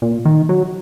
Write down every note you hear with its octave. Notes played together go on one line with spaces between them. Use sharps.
A#2
D#3
F#3